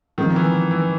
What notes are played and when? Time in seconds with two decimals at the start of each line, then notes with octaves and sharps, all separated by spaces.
0.18 D#3 F3 G#3 C4
0.36 E3
0.71 E3